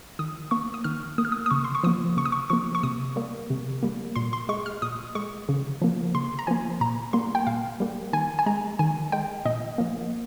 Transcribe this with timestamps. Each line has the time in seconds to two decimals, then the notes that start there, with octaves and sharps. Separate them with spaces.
0.19 D#3 D#6
0.51 A#3 C#6
0.74 D#6
0.84 D#3 F6
1.18 A#3 D#6
1.25 F6
1.32 D#6
1.46 D#6
1.51 C#3 C#6
1.64 C6
1.75 C#6
1.83 F3 A#3 D#6
2.17 C#3 C#6
2.25 D#6
2.32 C#6
2.50 F3 A#3 C#6
2.75 C#6
2.83 C3 D#6
3.16 G3 A#3
3.50 C3
3.83 G3 A#3
4.16 A#2 C6
4.33 C6
4.49 G#3 C#6
4.66 F6
4.82 A#2 D#6
5.15 G#3 C#6
5.49 C#3
5.82 F3 A#3
6.15 C#3 C6
6.39 A#5
6.47 F3 A#3 G#5
6.81 A#2 A#5
7.13 G3 A#3 C6
7.35 G5
7.47 A#2 F5
7.80 G3 A#3
8.13 D#3 G#5
8.39 G#5
8.46 G#3 A#5
8.79 D#3 G#5
9.12 G#3 G5
9.45 A#2 D#5
9.78 F3 A#3